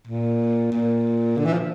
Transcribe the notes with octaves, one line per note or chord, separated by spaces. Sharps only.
A#2
A#2
D3
E3
F3